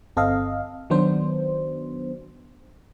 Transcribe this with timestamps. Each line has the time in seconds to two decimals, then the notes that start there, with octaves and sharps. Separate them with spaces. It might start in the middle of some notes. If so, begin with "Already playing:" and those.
0.16 G1 C4 A4 D#5 F5
0.90 D#3 F#3 B3 D4 C5